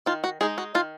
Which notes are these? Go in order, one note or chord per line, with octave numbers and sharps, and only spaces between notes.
D#3 F4
F#4
G#3 D#4 G#4
F#4
D#3 F4